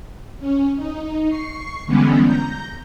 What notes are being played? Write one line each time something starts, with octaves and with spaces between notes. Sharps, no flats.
C#4
D#4
C#6 C7
D3 E3 G3 G#3 B3 C#4
A#5 G6